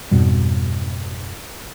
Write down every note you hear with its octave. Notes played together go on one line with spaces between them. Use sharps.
F2 G#2 B2 G3